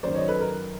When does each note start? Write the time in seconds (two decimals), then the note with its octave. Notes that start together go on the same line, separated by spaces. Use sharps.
0.03 F#2 D#3 C5 D5
0.15 C#5 D#5
0.28 A4 B4
0.41 A#4